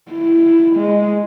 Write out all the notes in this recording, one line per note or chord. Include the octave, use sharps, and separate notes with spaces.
E4
G#3